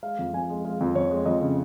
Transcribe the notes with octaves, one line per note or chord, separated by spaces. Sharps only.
G#3 F5
F2
F2 G#5
G#3
G#3 F5
F2
F2 C#5
G#3
F2 D#5
C#3